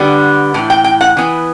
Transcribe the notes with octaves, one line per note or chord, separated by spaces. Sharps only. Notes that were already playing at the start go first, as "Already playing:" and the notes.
Already playing: D3 G3 B3
A2 E3
G5
G5
F#5
E3 B3